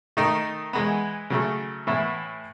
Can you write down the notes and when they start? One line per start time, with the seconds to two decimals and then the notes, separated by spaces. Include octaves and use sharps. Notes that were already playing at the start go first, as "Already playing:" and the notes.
0.17 D#3 A3 D#4
0.73 E3 G#3 B3
1.30 C#3 F#3 A3
1.87 A2 E3 B3 E4